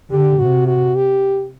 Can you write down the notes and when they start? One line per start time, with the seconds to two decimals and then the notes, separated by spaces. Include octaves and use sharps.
0.11 D3 G4
0.39 C3 F#4
0.67 F#4
0.95 G4